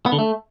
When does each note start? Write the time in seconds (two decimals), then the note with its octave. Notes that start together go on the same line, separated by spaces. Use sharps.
0.06 B3
0.12 D3
0.19 A3